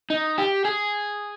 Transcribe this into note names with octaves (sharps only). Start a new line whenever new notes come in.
D#4
G4
G#4